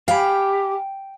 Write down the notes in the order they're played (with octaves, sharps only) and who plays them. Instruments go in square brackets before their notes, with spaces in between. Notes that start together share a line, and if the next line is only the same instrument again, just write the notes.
[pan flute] G4 [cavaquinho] F5 G#5 B5 [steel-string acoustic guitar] G5